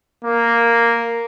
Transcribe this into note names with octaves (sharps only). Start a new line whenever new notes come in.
A#3